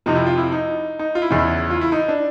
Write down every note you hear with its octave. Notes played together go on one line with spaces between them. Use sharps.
F2 C3 F3 D#4
E4
F4
E4
D#4
D#4
F4
E4
E2 C#3 E3 D#4
E4
F4
E4
D#4
D4